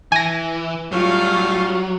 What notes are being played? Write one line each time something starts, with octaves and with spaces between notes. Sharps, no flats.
E3 G#5 A#6
A2 F#3 G3 C#4 F4 F5